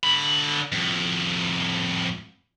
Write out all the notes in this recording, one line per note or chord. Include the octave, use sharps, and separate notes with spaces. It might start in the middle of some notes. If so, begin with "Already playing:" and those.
D3 B5
F2 A2